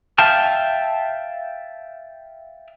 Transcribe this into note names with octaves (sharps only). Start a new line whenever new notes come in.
E5 F5 G5 A5 F6